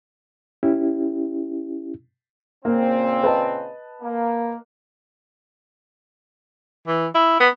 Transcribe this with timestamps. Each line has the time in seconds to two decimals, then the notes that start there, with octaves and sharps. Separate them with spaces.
0.63 C#4 E4 G4
2.65 A#2 C#3 A#3 C4
3.24 B4 D#5 A5
4.02 A#3
6.88 E3
7.15 E4
7.40 B3